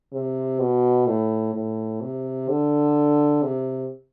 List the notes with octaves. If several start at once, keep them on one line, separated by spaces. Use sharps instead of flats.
C3
B2
A2
A2
C3
D3
C3